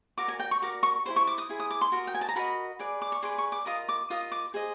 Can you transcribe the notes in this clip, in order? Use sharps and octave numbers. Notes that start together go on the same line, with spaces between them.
F#4 A#4 D5 D6
G#5
G5
C#6
F#4 A#4 D5 D6
C#6
E4 G#4 C5 C6
C#6
D6
D#6
E4 G#4 C5
D#6
D6
C6
F#4 A#4 D#5
G5
G#5
A5
A#5
F#4 A#4 D#5 B5
G#4 B4 D5
D6
C#6
G#4 B4 D5 C6
C#6
D6
F4 A#4 D#5 D#6
D6
F4 A#4 D#5 D#6
D6
G#4 C5 D#5